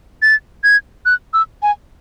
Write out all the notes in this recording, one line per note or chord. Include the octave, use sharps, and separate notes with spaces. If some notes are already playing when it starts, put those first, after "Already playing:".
A6
G#6
F#6
E6
G#5